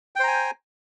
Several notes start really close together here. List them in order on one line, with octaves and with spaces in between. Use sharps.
G5 C5 A#5 G#5